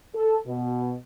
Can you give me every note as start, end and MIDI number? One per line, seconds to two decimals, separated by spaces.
0.15 0.37 69
0.47 0.93 47